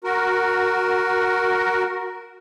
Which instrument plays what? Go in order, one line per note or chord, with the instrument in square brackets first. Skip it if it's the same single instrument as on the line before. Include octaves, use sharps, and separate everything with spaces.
[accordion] F#4 A#4